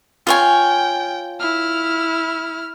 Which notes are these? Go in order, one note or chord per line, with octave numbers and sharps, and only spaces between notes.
F4 C#5 G5 G#5
E4 F6